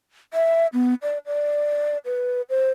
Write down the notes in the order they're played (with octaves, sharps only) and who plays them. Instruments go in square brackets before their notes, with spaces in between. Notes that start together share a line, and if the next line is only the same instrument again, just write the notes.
[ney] E5
B3
D5
D5
B4
C5